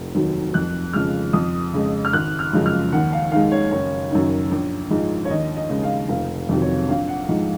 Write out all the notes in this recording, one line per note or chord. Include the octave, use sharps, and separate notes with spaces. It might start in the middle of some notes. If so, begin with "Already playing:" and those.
Already playing: F1
D#2 D#3 F#3
F2 F#6
C#3 F3 G#3 F6
F2 D#6
C#3 G#3
F6
G#1 F#6
F6
F#2 C#3 F3 G#3
F6
D#2 F#5
F5
D#3 G#3 F5
C#5
F#1 C#5
F#2 D#3
A#1
G#2 F3 G#3
C#5
D#2 D#5
D#5
C#3 G#3
F5
F1 F5
F2 C3 D#3 F#3
C#5
A#1 F5
F#5
G#2 F3 G#3 D#5